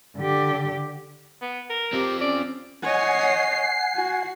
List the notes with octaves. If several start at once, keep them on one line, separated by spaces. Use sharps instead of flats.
D3 G4
B3
A#4
F3 C4 G4
C#4 D5
C#5 D#5 F#5 G#5 C7
F#4